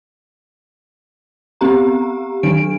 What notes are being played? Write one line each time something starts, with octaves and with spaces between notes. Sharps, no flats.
B3 C4 G4 A#5
D#3 F#3 D4 D7